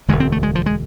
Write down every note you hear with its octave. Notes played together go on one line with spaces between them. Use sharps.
E1 D2 D3 G#3
C4
A3
G#3
F3
G#3